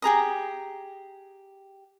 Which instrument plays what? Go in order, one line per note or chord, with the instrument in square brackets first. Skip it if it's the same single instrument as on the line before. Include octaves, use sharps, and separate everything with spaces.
[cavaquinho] G4 G#4 A#5 D#6